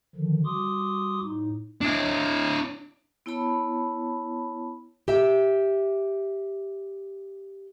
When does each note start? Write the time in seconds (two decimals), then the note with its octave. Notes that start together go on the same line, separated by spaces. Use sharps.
0.15 D3 D#3 F3
0.45 G3 F#4 C6 D6 D#6
1.23 A2 D#4
1.81 D4 E4
3.26 B3 E4 C#5 A5 B5
5.08 G4 E5